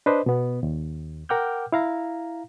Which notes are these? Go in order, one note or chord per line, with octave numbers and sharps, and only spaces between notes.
D4 B4 C5 D#5
B2 B3
D#2
A#4 F#5 G5 D6 F6 G6
E4 F5 A#5